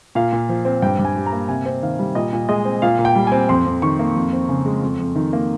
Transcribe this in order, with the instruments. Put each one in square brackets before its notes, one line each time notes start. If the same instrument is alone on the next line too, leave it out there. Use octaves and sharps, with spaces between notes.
[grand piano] A#2 F5
A#2
F3
C4
G2 G5
G2
G#5
G3
A#5
A#3
C3 G#5
C4
D#3 F5
G3
A#2 D#5
A#2
G#3 D#5
C4
A#2 F5
A#2
G5
G3
C4 G#5
F2 C6
F2
D#3 C#6
A#3
F2
C4
C#3
G#3
F2
F2
D#3
A#3